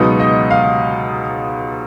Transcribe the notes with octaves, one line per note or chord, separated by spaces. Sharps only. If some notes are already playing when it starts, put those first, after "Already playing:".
Already playing: C#2 B2 F#3 B3 D#4
D#5
F5